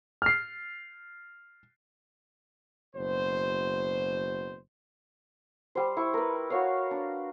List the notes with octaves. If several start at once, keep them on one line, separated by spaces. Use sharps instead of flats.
F6 C7
F#1 B2 C5
G3 C5
E4 C#6
A#4 B4
F#4 C#5 F5
D4